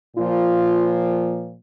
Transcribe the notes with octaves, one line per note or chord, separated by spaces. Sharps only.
A#2 F3 F4